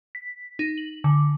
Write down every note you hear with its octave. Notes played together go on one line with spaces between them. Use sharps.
B6
D#4
F#7
D3